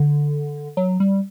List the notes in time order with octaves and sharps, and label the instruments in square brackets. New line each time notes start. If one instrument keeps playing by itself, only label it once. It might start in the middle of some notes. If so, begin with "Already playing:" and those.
Already playing: [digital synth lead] D3
F#3
G3